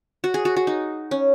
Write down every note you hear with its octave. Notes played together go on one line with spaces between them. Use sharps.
F#4
G#4
F#4
F#4
D#4
C#4